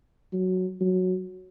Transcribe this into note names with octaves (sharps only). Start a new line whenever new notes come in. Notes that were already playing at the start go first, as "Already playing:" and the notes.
F#3
F#3